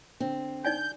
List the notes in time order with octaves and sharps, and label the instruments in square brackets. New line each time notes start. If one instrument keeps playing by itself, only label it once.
[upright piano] D3 [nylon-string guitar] C4
[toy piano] D#4 D5 G#5 [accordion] G6